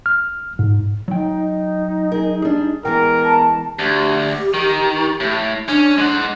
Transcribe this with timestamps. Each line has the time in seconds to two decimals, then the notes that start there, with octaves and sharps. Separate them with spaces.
0.06 F6
0.59 G#2
1.08 F#3 D#4 G5
2.12 G#4 A#4
2.42 G3 D4 G#4
2.85 E3 G#3 B3 A#4 G5
3.24 A5
3.79 D2 G4
4.54 D#3
5.20 A2
5.69 C#4 D4
5.98 G#3 F#5